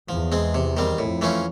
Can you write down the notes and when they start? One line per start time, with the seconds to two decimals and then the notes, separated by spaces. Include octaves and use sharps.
0.09 E2 F3
0.32 G#3 C4
0.55 C3
0.77 D#3 G3 C4
0.98 F2 A2
1.21 E3 A3 C#4 F4